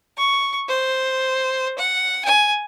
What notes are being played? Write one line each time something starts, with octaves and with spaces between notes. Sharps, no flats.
C#6
C5
F#5
G#5